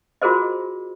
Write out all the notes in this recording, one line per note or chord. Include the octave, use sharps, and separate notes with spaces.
F4 F#4 G#4 A#4 C5 D#5